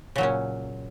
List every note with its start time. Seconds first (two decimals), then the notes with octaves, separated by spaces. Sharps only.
0.16 C#3
0.18 F#3
0.21 A#2
0.23 C#4